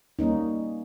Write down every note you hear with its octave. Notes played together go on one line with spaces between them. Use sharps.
G3 A#3 C#4 D#4